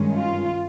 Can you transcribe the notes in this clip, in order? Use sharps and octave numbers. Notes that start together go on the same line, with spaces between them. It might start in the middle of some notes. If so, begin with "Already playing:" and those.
Already playing: G2 D#3 G#3 C#4
F4